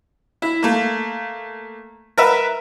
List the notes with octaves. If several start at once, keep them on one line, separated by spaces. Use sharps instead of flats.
E4
A3 A#3
A#4 B4 E5 F#5